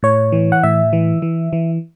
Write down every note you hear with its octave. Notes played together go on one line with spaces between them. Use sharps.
A2 C#5
E3
F#5
A2 E5
E3
E3
E3